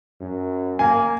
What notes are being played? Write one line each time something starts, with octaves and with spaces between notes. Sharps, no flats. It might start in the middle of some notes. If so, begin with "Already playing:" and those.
F#2
A#3 G#5